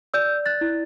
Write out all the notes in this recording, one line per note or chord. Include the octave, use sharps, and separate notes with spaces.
D5 E6 G6
F#6 A6
E4